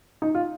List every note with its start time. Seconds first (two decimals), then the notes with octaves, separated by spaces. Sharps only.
0.22 D#4
0.35 F4